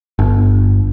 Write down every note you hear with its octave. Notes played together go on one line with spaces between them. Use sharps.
G1